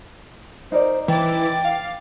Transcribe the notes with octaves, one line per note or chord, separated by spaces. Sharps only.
D#4 A#4 C5 D5
E3 G5 D6 A6
F5